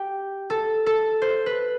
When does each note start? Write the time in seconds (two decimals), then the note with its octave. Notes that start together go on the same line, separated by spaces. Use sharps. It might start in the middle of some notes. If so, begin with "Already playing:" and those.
Already playing: G4
0.50 A4
0.86 A4
1.22 C5
1.46 B4